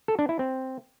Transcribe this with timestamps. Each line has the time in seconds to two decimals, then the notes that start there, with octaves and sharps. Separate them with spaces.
0.08 A4
0.19 D4
0.29 E4
0.39 C4